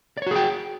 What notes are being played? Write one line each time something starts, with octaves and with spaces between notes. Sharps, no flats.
F#4 G#4 C#5 D5 G5